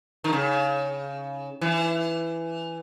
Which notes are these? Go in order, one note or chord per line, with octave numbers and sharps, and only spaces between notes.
D#3
C#3
E3